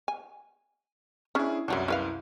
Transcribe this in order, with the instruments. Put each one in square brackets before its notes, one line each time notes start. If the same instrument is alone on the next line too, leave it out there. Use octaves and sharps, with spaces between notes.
[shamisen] G#5
[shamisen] C#4 D4 [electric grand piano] E4 G#4
[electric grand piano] C2 F#2 [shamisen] E3 F#3 D4
[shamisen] E4 B4 F5